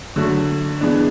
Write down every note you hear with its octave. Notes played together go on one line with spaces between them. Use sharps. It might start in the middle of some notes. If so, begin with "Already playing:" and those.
D3 F#3 A3
E3 G#3 B3 D4